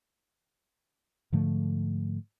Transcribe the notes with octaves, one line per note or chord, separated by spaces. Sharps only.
G#2 D3 F3 A3